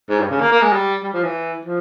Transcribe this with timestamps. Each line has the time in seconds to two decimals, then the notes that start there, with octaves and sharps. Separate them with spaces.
0.10 G#2
0.20 G2
0.31 C#3
0.41 A#3
0.52 A#3
0.62 G#3
0.72 G3
1.03 G3
1.13 F3
1.24 E3
1.65 F3